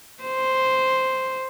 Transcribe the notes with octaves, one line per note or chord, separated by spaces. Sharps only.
C5